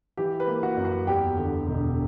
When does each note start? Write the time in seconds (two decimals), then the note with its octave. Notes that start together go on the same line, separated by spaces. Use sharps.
0.17 E3 G4 G5
0.40 B4
0.47 A#3
0.63 F#4 F#5
0.77 F#2
0.85 F#4 F#5
1.07 E2 G4 G5
1.37 D3
1.67 E1